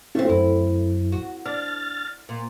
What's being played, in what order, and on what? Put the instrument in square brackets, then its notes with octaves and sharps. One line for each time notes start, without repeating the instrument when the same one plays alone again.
[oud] A3 C4 [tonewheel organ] C#4 E4 F4
[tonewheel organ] F#2 [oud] E4
[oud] F#4
[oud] D4 [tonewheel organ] F6 A6
[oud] A#2